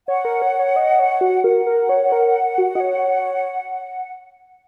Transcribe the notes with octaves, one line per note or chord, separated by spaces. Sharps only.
C#5 F#5
A#4
C#5
C#5
D#5
C#5
F#4
A#4 F#5
A#4
C#5
C#5
A#4
F#4
D#5
C#5